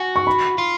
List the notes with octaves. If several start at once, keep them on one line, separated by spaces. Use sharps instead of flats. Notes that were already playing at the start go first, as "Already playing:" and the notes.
Already playing: F#4 G#5
C#6
B5
F4